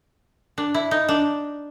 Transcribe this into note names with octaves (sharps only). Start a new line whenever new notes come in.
D4
E4
D#4
D4